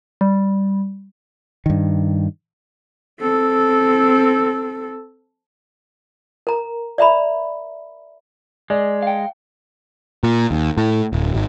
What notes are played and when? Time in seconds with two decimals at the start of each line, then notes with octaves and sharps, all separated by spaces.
0.21 G3
1.66 G2 D#3
3.20 C4 A4
6.47 A#4 A#5
6.98 D5 E5 A#5 B5
8.70 G#3 D5
9.03 F5 G5
10.23 A#2
10.51 D#2
10.78 A2
11.13 D1
11.35 G#1